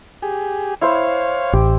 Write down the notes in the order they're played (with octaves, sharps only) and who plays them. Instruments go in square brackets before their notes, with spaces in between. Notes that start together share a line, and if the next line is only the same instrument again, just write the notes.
[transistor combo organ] G4 G#4
[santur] E4 C5 [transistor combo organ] C#5 F5
[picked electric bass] A1 [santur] G4